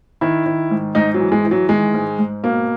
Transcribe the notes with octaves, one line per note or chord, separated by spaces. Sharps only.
D#3 E4
D#3
G#2
G#2 D#4
F#3
E3
G#3
E3
F#3
D#3 G#3
G#2
G#2
B2 A#3